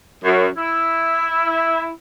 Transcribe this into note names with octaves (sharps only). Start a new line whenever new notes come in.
F#2
E4